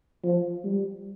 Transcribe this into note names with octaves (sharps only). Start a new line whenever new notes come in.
F3
G3